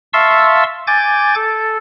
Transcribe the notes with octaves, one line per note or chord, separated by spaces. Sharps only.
E5 F5 A5 C6 C#6 E6
G#5 D6 G6 A6
A4